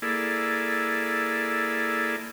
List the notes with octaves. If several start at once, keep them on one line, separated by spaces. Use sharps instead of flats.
A#3 E4 G#4 A4 D5